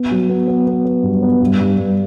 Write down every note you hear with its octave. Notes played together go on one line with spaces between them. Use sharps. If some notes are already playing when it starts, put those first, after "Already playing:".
Already playing: B3
F#3
B3
B3
B3
B3
G2
B3
G2
G2
G2